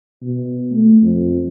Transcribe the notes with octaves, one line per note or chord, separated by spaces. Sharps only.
B2
A3
F2